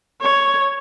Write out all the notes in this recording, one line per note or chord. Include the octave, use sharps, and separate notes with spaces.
C#5